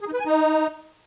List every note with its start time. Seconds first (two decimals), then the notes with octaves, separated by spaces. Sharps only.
0.01 G#4
0.07 D#4
0.13 B4
0.19 G#5
0.26 D#4